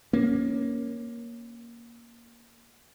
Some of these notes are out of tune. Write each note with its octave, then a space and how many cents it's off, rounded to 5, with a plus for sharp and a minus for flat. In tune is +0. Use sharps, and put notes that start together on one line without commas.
A#3 +10 C#4 +0